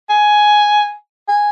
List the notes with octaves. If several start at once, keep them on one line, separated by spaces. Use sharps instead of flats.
G#5
G#5